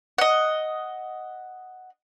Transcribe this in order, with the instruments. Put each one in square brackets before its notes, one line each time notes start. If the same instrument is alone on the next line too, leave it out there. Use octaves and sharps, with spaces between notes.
[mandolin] D#5 F#5